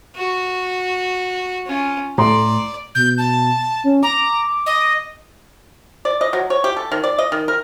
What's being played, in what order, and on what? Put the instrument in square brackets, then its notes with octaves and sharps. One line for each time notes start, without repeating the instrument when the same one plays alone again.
[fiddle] F#4
C#4 F4
[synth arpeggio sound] A2 [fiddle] D5 [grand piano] A#5 C6
[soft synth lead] B2 [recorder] G6
[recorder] A5
[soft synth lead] C#4
[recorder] A#5 [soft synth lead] D6
[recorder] D#5
[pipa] D5
D#5
F#3
C#5
G4
A4
D#3
D5
D#5
D#3
A#4